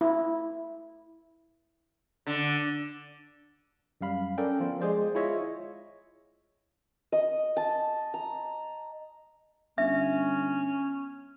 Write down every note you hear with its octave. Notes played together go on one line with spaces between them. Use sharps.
E4
D3
F#2 G3 F5 B5
C#4 A4 A#4 D5 G5
F3 B3 F4
G#3 G#4 C5 D5
E4 F4 G#4 C#5 D#5 E5
D#5
A5
A#5
G1 C#4 E5